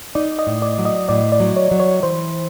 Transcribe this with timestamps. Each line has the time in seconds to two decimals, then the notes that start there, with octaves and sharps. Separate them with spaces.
0.15 D#4 D5
0.39 D#5
0.47 A2
0.62 D5
0.78 F#3
0.85 D#5
1.09 A2 D5
1.32 D5
1.40 F#3
1.57 C#5
1.72 F#3
1.80 C#5
2.03 E3 C5